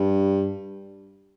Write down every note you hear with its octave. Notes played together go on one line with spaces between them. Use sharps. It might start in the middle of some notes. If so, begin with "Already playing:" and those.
Already playing: G2